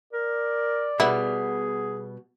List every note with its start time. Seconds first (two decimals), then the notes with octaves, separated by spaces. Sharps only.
0.13 A#4 D5
1.00 B2 G3 B3 E4 G#4